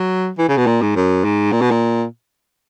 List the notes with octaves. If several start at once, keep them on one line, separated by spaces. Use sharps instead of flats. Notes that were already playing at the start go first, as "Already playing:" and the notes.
Already playing: F#3
E3
C#3
B2
A#2
G#2
F#2
G#2
A#2
B2
A#2